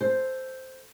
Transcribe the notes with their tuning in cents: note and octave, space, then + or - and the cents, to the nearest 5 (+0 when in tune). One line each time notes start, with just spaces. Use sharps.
A4 +0 C5 +0